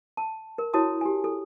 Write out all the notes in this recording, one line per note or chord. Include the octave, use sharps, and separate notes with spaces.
A5
A#4
E4 F#4 C#5 A5 D#6
G4 G#5
A4